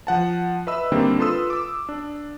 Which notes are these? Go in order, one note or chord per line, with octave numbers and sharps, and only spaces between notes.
F3 F#5 A5
B4 D#5 E5 B5 E6
D3 D#3 G3 A#3 C4 D4
F4 A4 B4 C6 D#6 E6
D6 E6
D4